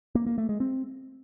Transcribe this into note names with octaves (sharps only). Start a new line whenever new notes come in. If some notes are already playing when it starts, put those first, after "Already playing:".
A#3
A#3
A3
G#3
C4